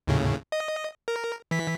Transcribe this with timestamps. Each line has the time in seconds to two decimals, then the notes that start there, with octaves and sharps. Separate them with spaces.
0.07 D#2 A2 C#3
0.52 D#5
1.08 A#4
1.51 E3 B6